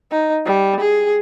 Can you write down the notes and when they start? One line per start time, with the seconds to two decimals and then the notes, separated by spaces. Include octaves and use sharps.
0.11 D#4
0.45 G3
0.80 G#4